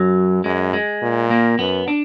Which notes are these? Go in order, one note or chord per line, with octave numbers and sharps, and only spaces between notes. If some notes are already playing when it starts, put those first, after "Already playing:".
Already playing: F#2 F#3
F#2 G#3
G#3
A#2
A#3
F#2 B3
D4